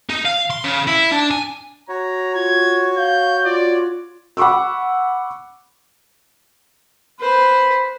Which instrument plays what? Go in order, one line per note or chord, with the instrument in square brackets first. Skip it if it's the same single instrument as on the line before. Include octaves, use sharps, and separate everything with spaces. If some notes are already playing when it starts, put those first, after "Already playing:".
[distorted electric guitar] D#4
F5
C6
C#3
E4
D4
G#5
[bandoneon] F#4 C#5 [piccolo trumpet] A#5
[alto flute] F4 [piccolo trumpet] G#6
[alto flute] F5 [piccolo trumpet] G6
[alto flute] F4 [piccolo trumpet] D5
[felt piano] F#5 B5 C#6 D6 E6
[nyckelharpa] B4 C5 [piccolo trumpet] B5